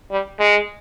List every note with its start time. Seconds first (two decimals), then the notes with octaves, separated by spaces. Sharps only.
0.11 G3
0.39 G#3